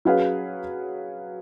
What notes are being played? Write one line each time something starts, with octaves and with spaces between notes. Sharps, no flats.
F#3 C#4 G#4 B4 F5